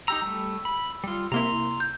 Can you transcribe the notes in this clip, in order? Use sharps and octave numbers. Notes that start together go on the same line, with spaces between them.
D#4 G4 A#5 E6
G3 A3
B5
G3 F4
C3 A#3 E4 A#5 C6
G6